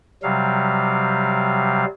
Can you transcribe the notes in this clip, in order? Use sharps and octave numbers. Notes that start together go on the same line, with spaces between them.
C3 F#3 G3 F5